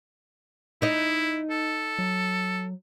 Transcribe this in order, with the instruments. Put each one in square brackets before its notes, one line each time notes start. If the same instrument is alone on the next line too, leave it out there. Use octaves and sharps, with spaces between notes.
[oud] D#4 D#5 [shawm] E4
[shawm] A4
[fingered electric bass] F#3